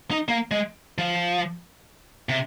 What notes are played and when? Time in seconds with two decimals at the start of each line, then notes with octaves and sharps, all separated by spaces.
0.11 D#4
0.28 A#3
0.51 G#3
0.98 F3
2.29 C3